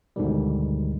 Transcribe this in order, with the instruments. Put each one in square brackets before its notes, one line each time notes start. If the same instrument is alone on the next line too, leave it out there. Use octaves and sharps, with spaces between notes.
[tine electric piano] D2 G#2 B2 D3 D#3 G3